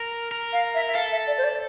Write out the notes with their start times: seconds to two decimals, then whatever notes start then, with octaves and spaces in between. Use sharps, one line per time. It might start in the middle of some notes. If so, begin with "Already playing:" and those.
Already playing: A#4
0.32 A#4
0.53 F5
0.75 E5
0.88 E5
0.95 A4 F5
1.12 E5
1.27 D5
1.38 C5
1.44 D5